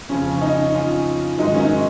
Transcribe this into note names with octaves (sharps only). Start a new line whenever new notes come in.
F2 C#3 F3 C#4
C#4
D#4
C#4 F4
G#2 D#3 F#3 D#4
C#4
D#4